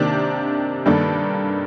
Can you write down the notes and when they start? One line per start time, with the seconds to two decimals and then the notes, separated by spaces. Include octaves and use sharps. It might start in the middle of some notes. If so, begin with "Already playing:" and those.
Already playing: C3 D#3 A#3 D4 G4
0.86 G2 D#3 A#3 D4 A4